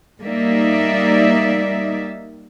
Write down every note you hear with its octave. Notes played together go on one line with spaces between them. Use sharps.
G3 A#3 D#4 D5 E5